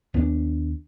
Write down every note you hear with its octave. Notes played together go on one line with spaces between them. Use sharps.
D#2 B3 C#4 D4